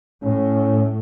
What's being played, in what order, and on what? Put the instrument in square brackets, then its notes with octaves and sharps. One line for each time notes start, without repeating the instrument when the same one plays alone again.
[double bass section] A2 [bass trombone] C#4